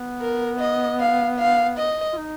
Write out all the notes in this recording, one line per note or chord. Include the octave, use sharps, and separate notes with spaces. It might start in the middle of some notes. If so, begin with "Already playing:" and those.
Already playing: B3
A#4
D#5
F5
F5
D#5
F4
D#4